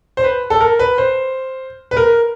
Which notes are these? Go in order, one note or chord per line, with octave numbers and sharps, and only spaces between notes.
C5
B4
A4
A#4
B4
C5
B4
A#4